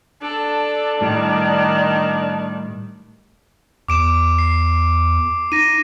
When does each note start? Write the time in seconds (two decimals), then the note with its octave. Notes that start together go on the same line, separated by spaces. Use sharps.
0.22 D4 A4
1.01 A2 D#3 G3
3.88 E2 D6 D7 E7
4.39 C7
5.52 D#4 A#6 D#7